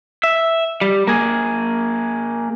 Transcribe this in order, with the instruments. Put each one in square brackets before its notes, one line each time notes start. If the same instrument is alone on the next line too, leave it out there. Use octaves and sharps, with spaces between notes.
[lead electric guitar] E5
G3
A#3 G#4